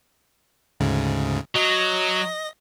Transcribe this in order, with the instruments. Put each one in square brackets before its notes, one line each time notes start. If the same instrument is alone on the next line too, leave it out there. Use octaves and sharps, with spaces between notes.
[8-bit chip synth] D2 G#2 C#3
[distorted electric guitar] F#3 [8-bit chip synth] D#5 A#6